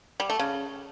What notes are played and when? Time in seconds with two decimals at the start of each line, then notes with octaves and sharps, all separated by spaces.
0.20 G3
0.30 A3
0.39 C#3